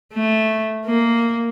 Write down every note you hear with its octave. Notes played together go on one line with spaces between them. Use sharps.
A3
A#3